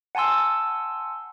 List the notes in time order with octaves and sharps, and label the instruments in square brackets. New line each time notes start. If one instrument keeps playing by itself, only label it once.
[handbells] F#5 G#5 A5 C6 E6